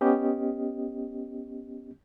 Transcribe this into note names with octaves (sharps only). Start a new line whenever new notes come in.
B3 C#4 G4 D#5